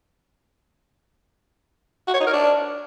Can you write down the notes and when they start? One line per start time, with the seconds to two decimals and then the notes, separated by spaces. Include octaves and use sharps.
2.07 F#4
2.14 C#5
2.20 D#4
2.27 A#4
2.33 D4